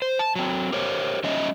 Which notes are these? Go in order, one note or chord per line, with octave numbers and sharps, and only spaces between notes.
C5
A5
F#3 C4
G4 A#4 C5 C#5
F#3 G#3 C#4 C#5 D#5 E5